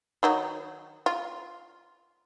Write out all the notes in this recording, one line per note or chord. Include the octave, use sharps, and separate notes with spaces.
D#3 F#3 D#4
F4